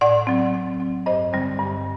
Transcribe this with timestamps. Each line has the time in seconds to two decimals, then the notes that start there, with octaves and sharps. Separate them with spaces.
0.01 A2 D5 F#5
0.27 F#3 C4
0.53 A2
0.80 F#3 C4
1.06 G2 C5 D#5
1.33 D3 G3 C4
1.59 G2